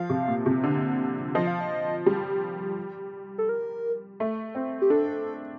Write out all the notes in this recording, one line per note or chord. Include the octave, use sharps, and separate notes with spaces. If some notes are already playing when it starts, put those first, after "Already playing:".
Already playing: F3 F5
C3
A#2
C3
D3
F3 D#5
F5
D#5
G3
A4
A#4
A3
C4
G4
D4 A4